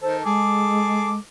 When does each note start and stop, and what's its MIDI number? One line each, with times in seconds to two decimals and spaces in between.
0.02 0.25 51
0.02 0.25 69
0.02 0.17 72
0.25 1.19 56
0.25 1.15 68
0.25 1.15 69
0.25 1.15 86